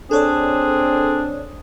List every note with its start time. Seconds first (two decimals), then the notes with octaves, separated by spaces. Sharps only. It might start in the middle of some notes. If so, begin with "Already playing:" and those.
0.11 C4 D4 G#4 A4 C#5 D5